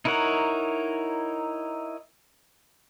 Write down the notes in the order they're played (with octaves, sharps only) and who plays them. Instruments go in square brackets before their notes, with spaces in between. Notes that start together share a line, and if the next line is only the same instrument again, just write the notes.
[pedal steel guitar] D#4 E4 A#4 C#5 F#5